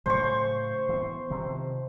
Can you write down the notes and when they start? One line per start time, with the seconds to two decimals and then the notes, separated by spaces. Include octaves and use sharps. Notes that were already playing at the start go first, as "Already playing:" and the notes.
0.06 A2 C#3 F#3 C5 C#6
0.89 E3 B3
1.30 C3 D#3 F3